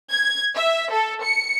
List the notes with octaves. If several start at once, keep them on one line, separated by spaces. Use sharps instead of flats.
G#6
E5
A4
C#7